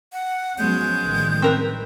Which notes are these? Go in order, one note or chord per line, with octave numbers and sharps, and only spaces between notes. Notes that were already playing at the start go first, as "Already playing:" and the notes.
F#5
F3 F#3 G#3 B3 C#4 G6
A1 D#3 G3
C4 A#4 B4